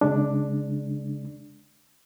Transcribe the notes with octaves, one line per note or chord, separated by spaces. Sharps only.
C#3 G#3 D4